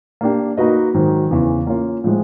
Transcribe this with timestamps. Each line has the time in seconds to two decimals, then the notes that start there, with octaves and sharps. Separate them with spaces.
0.21 A#3 D4 G4
0.57 A#3 D#4 F#4 B4 D#5
0.94 G#2 D#3 F#3
1.31 E2 C#3 E3
1.67 A#3 C#4 F4
2.04 A2 F3 G#3